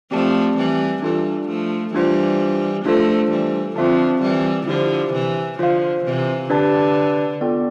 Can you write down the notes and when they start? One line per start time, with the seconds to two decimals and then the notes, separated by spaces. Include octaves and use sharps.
0.11 F3 A3 C4 G4 D5 A5
0.57 E3 G3
1.02 E3 G3 D4 F4 A4
1.48 F3 A3
1.94 E3 G3 D4 F4 C5
2.85 F3 A3 D4 F4 A4 C5
3.31 E3 G3
3.76 D3 F3 C4 F4 C5 E5 A5
4.22 E3 G3
4.67 D3 F3 E4 G4 C5
5.13 C3 E3
5.59 D3 F3 F4 C5 F5
6.05 C3 E3
6.50 D3 D4 G4 B4 D5 A5
7.41 B3 F4 A4 D5 G5